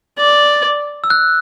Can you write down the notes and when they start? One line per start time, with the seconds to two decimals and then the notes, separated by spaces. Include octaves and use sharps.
0.18 D5
1.04 E6
1.10 F#6